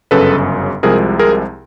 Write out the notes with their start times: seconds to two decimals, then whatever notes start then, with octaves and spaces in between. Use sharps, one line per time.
0.11 G1 F#2 C#3 A4 B4
0.83 C2 C3 F3 G#3 G#4 A#4
1.19 G#4 A#4